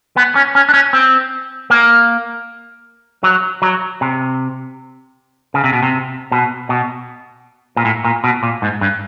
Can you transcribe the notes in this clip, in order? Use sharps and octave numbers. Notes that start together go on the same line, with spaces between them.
B3
C#4
C#4
D4
C#4
C4
A#3
F#3
F#3
C3
C#3
C3
B2
C3
B2
B2
A#2
A2
A#2
B2
A#2
G#2
G2